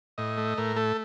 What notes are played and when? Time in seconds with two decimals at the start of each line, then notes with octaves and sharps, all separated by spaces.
0.18 A2 D#5
0.37 A3
0.58 A2 A#4
0.76 A3 A4